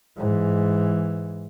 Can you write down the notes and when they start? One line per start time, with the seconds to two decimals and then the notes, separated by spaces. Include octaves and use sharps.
0.18 G#2 E3